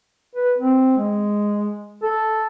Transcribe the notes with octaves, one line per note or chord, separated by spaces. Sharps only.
B4
C4
G#3
A4